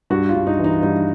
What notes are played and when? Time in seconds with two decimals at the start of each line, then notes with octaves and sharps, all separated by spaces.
0.10 G2 F#4
0.29 F4
0.35 G2
0.47 D#4
0.59 E3
0.64 D#4
0.82 G2 D#4